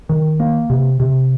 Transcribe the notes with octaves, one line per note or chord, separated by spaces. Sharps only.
D#3
A#3
C3
C3